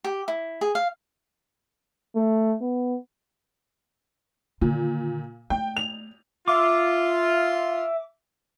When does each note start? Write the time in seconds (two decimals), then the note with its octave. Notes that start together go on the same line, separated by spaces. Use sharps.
0.04 G4
0.28 E4
0.61 G#4
0.75 F5
2.16 A3
2.62 B3
4.61 A#2 D3 D#3
5.50 A3 G5
5.77 F7
6.48 F4 E5 D6